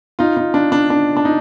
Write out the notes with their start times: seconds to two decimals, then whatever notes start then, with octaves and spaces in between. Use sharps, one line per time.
0.19 D#4 F4
0.37 D#4
0.54 D4
0.72 D4
0.90 D4
1.17 D4
1.25 D#4